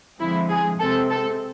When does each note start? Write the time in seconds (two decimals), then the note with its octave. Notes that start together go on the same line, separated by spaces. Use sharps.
0.20 D3 F3 G#3 C4 E4
0.50 G#4
0.80 C3 G#3 C4 A4
1.10 A4